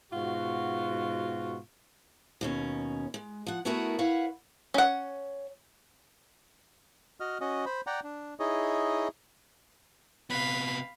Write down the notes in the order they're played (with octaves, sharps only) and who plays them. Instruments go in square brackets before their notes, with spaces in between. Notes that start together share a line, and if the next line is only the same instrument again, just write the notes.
[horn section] G#2 B2 F4 F#4
[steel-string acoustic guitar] D#2 B2 C#4
G#3
F3 F#5
A3 B3 E4 F#4 G#4 A#4
E4 B4 C#5 F5 F#5
[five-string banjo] C#4 F#5
[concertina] F#4 D#5 F6
C#4 F#4 D#5
C5 B5
D5 F#5 G5 A#5
D4
D#4 E4 G#4 C#5 D#5
[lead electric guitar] C3 B3 [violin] F5 B5